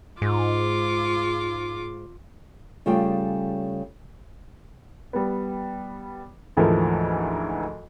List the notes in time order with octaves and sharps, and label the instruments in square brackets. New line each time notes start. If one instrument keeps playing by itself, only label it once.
[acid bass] G#2 [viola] F4 D6
[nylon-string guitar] C#3 G3 A3 F4 G#4 G5
[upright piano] G3 B3
D2 G#2 E3 F3 A4 A#4